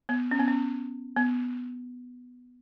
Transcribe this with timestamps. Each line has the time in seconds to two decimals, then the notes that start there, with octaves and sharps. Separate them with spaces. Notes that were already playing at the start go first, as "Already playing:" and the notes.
0.09 B3
0.31 C#4
0.39 B3
0.48 C#4
1.16 B3